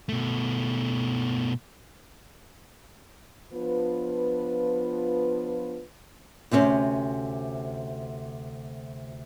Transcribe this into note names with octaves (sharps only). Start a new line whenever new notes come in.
B2 A3
F3 B3 D4 F4 B4
D2 C3 C4 C#4